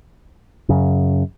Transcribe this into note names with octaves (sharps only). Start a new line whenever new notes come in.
F#2 C#3